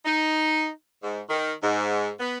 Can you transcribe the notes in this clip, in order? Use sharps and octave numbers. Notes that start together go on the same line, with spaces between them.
D#4
G#2
D#3
G#2
B3